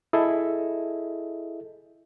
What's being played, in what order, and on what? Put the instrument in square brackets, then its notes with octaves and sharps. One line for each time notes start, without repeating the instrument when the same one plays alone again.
[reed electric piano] E4 G#4 A4 D#5 E5